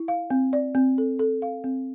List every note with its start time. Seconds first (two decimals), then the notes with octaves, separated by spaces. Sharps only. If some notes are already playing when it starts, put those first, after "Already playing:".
Already playing: E4
0.08 F5
0.30 C4
0.53 D5
0.75 C4
0.98 A4
1.19 A4
1.42 F5
1.64 C4